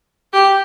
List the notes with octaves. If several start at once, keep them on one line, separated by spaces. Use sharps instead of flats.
G4